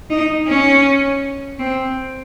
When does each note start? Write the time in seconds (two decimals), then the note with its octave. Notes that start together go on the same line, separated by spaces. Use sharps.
0.10 D#4
0.48 C#4
1.59 C4